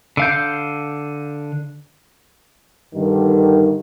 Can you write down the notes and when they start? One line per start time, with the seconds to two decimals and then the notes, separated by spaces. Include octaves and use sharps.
0.17 D3 F5 G6
2.94 G2 D3 D#3